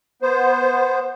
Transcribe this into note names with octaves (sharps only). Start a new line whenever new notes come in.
B3 C5